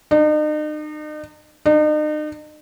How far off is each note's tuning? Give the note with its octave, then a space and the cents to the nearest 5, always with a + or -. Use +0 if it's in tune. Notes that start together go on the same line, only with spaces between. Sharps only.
D#4 -40
D#4 -40